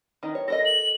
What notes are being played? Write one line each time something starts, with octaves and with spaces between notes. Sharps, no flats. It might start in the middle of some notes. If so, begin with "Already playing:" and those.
D#3 D#4
C#5
A4 A#4 D#5 A#6
F#7